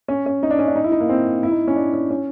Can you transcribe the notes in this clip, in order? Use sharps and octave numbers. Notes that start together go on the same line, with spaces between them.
C#4
C#4
D#4
D4
C#4
D4
D#4
E4
D#4
A#3
C4
E4
D#4
C#4
D4
C#4
C#4